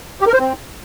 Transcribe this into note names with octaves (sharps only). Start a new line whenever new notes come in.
G4
A#4
C5
C4